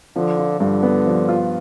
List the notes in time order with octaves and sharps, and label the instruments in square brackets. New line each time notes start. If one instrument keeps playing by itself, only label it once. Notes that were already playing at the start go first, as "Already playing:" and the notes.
[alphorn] D3 [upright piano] F3
[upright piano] F4
[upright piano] G2 [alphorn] D3
[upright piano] B3
F3
F4